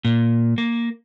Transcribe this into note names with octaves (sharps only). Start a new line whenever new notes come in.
A#2
A#3